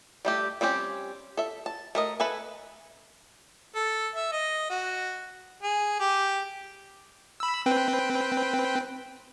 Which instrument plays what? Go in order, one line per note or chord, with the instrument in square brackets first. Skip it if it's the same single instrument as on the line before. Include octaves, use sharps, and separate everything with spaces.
[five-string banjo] G3 A3 G4
G3 C4 C#4 G4
A4 E5
A5
A3 A#4 D#5
A4 B4 E5 G#5
[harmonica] A4
E5
D#5
F#4
G#4
G4
[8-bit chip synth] B5 E6
C4 B4 G5